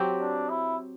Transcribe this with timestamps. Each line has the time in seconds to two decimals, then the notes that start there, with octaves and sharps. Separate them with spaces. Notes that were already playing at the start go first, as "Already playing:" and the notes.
Already playing: F#3 C4 G4
0.20 D4
0.49 E4